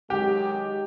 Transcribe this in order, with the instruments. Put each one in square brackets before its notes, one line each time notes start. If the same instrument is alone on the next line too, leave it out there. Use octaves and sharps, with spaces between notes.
[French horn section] D#3 F#3 G#3 [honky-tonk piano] G4